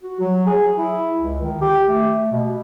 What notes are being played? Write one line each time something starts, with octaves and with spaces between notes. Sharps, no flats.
F#4
F#3
G#4
E4
C#2
D#3
G4
A3
B2